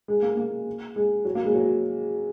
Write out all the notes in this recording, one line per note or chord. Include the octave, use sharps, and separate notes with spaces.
G#3
A#3
A#3
G#3
F#3
A#3
G#3
F#3